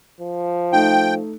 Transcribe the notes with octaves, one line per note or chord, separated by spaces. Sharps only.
F3
A3 D#4 G5